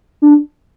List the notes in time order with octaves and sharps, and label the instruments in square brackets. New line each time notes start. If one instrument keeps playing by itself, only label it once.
[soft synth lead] D4